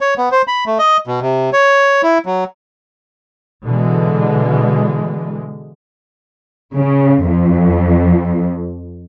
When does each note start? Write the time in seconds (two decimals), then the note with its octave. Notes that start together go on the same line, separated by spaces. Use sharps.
0.01 C#5
0.18 B3
0.32 C5
0.47 B5
0.66 A3
0.79 D#5
1.07 B2
1.21 C3
1.53 C#5
2.03 E4
2.26 F#3
3.65 B2 D3 E3 G#3
6.76 C#3
7.25 F2